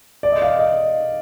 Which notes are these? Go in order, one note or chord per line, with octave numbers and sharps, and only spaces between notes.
D5
D#5
F5
D#5